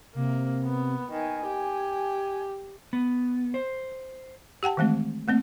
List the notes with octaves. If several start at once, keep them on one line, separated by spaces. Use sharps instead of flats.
C3 A#3
B3
D#3 G#5
G4
B3
C5
G4 F#5 G5 A5
D#3 E3 G#3 A3 C4
A3 A#3 C4